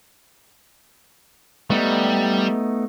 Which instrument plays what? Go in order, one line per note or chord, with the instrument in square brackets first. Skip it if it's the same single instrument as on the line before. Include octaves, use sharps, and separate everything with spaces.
[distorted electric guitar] G3 [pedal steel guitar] A3 B3 D#4